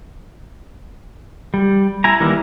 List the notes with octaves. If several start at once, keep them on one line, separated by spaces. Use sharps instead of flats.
G3
E4 G#5 A#5
D#3 E3 G3 A#3 E4